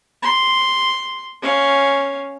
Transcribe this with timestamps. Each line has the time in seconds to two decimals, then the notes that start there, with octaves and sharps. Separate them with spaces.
0.22 C6
1.42 C#4 F5